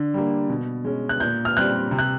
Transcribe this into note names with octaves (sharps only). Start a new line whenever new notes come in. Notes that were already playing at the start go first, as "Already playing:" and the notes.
Already playing: D3
G3 A#3
B2
G#3 C#4
F#6
A#2 G6
F6
G3 C4 F#6
C3
F#6